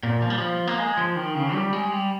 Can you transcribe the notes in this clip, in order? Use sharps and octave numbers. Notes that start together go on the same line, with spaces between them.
A#2
F3
G3
F3
A#3
G#3
F3
D#3
C#3
G3
G#3
G3